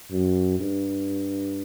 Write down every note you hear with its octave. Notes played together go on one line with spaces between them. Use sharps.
F#2
G2